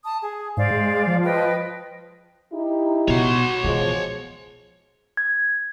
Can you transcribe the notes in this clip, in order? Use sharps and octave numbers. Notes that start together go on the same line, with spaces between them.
A5 D#6
G#4
G#2 C5 D5 F5
G#3
F3
B4 D#5 G5
D#4 E4 G4
B2 F#4 C#5 C6
B2 E3 F3 G#3
G#6